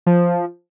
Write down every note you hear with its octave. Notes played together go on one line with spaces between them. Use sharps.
F3